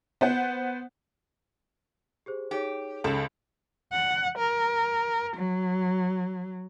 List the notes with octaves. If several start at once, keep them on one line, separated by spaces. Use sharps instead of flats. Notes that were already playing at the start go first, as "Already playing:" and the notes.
B3 C5 F#5
G4 G#4 C5
D#4 G4 G#4 C#5
C#2 A4
F#5
A#4
F#3